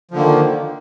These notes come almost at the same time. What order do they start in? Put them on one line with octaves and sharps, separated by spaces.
F3 D3 A#3 D#3